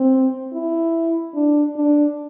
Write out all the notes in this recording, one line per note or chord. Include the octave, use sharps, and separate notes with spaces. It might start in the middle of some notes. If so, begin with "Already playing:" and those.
Already playing: C4
E4
D4
D4